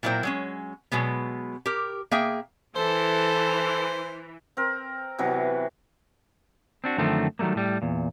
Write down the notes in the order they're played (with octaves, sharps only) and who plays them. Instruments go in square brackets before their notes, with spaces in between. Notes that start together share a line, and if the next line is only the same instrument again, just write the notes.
[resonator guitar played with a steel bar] A#2 F#3 E4 A#4 C5 G5
F#3 G#3 C#4
B2 F#3 G#3 B3
G4 A#4
A#3 G#4 E5 G5
[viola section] E3 [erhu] A4 [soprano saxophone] C5
[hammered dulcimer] C4 A#4
C3 E3 F#3 B3
[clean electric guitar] C4 D4 F#4
F#2 D3 D#3 F3 A3 C4
D#3 F#3 G3 A3 A#3
A2 G3
E2 A#2